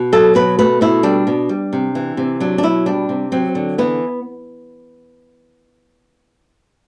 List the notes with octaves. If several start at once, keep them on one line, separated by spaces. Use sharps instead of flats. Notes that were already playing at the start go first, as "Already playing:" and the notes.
Already playing: B2
F#3 A4
B2 B4
A3 B4
B2 E4
G3 D4
B2
G3
C3
E3
C3
F#3 D4
D4
B2 E4
G3 D4
C3
F#3 C4
D3
E3 B3